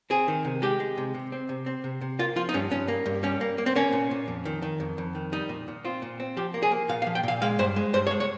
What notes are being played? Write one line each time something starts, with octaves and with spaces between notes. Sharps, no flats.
C4 G#4
D#3
C3
G#3 G4
G#3
C3
C3
C4
C3
C4
C3
C3
A#3 F4
F3 F4
D#4
G2 C#4
G2 C#4
A#3
G2
G3 C#4
A#3
A#3
C4
A#3 C#4
A#2
A#2
F2
D#3
D#3
F2
F2
D#3
G3 D#4
A#2
A#2
C4 F4
A#2
C4
F3 G4
A#3
G#4
A#3
A#2 F5
F5
F3
G5
A#2 F5
G#3 F5
G2 C5
G#3
G2 C5
C#5
G#3
C#5